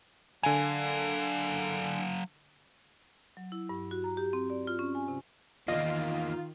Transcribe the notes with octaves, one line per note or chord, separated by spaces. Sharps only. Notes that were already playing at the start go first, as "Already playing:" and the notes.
D3 F#3 F5 G#5
F#3
E4
G2
F#4
A#5
G4
C4
D5
F4
C#4
G#5
C3
E2 D#3 A#3 F4 D#5